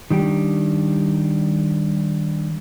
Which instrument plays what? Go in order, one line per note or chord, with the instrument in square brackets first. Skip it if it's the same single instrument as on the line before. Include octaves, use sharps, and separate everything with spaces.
[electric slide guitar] D#3 G3 D4 G4